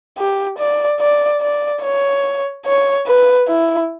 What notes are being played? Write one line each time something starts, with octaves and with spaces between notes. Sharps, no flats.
G4
D5
D5
D5
C#5
C#5
B4
E4